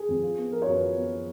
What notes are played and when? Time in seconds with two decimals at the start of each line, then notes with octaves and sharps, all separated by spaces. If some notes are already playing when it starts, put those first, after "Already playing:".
Already playing: G#4
0.08 F2
0.23 F4
0.38 B3
0.52 F3 A#4
0.62 C#5
0.66 F#2
0.72 B4
0.82 F4
0.96 B3
1.11 F3